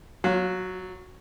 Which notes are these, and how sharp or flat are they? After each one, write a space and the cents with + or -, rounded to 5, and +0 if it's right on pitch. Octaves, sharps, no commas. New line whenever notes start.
F#3 +0 F4 +40